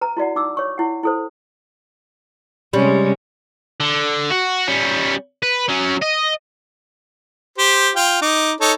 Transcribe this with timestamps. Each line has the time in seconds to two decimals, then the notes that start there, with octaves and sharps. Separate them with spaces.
0.01 B4 A#5
0.17 E4 F#4 D5 F#5
0.36 D#4 D6 E6
0.57 C#5 C#6
0.78 E4 F#5
1.03 E4 A4 C5
2.73 C3 G3 G#3 C#4
3.80 D3
4.30 F#4
4.68 G3 C#4
5.43 B4
5.69 F#3 C#4
6.02 D#5
7.58 G4 C5
7.96 F4 G5
8.22 D#4 D6
8.61 D#4 A4 C#5